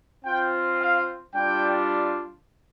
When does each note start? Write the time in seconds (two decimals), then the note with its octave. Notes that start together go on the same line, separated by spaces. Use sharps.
0.25 C4 F4 G5
0.80 F5
1.34 G3 D4 F4 G5